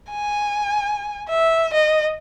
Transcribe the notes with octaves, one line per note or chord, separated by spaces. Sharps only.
G#5
E5
D#5